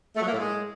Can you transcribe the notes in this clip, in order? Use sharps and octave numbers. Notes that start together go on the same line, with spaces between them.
A3
F#3
A#3
A2
G#3